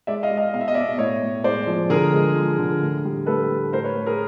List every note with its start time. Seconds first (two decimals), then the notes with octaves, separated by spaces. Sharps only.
0.07 G#3 D5 E5
0.23 D#5 F5
0.31 G#3
0.37 D#5 F5
0.54 B2 F5
0.61 E5
0.68 D#5
0.74 B2 D5 E5
0.98 A2 C#5 D#5
1.22 A2
1.44 G#3 C5 D5
1.67 F3
1.90 D3 G#4 A#4
2.13 G#3
2.35 F3
2.59 D3
2.82 A2
3.05 G3
3.26 A2 A4 B4
3.49 A2
3.72 A2 A#4 C5
3.84 B4 C#5
3.96 A2
4.06 G#4 A#4